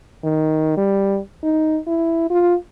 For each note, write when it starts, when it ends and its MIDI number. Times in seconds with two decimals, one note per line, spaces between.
0.24 0.73 51
0.77 1.18 55
1.43 1.79 63
1.87 2.30 64
2.30 2.54 65